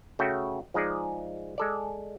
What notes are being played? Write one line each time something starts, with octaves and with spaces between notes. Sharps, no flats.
C#3 A3 F#4 G5
F3 G#3 D#4 G#4 D5
G#3 A4 D5